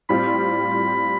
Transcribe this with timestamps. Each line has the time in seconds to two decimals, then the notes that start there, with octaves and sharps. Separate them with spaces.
0.09 A2 G3 C4 F4 B5